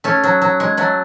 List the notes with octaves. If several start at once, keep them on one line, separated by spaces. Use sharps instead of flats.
A3 C#4
F#3
F#3
G#3
F#3 A3